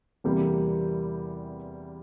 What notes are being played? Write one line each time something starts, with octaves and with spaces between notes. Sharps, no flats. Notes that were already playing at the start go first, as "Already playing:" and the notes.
E2 C3 E3 G3 A#3